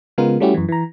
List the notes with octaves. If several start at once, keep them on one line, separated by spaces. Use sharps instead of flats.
C#3 G#3 B3 F4 A#4
G3 A3 C#4 E4 F#4 G4
F#2 E3
E3 A#5